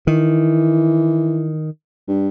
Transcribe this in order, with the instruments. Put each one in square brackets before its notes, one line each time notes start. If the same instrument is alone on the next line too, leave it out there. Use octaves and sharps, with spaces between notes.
[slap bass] D#3 [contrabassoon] E3
[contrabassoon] G2